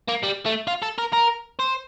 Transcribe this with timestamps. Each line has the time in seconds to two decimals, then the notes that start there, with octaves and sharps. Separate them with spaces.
0.08 A#3
0.23 G3
0.46 A3
0.68 F4
0.83 A4
0.99 A#4
1.13 A#4
1.59 C5